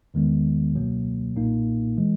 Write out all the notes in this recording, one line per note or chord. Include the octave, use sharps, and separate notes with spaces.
E2 D#3 G#3 B3
C#2 B2 F#3 A#3
B1 A#2 A#3 D#4
E3 G#3